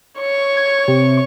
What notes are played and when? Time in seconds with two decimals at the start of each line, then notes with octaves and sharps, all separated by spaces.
0.19 C#5 C#6
0.57 G#6
0.88 C3